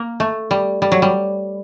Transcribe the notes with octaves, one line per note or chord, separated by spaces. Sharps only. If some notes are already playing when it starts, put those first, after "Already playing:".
Already playing: A#3
A3
G3
G3
F#3
G3